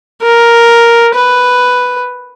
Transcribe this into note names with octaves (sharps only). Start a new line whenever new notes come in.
A#4
B4